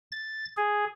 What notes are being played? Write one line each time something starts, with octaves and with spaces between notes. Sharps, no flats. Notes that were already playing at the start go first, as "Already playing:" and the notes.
A6
G#4